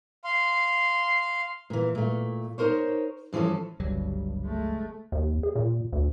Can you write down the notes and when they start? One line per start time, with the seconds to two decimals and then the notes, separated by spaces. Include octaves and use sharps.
0.24 F5 C6
1.70 A#2 E3
1.95 A#2 A3
2.58 D#4 A#4 C5 C#5
3.33 G2 E3 F3 C#4 A4
3.80 G1 C#2 F#3 G3
4.45 G#3 A3
5.12 D#2
5.43 G#4
5.56 A#2
5.93 D2